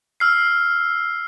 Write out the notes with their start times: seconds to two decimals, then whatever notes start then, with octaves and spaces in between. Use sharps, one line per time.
0.20 E6 F6 C7